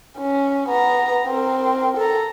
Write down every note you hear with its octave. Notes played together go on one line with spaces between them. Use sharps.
C#4
B3 A#5
C4 A#4
A4 A#5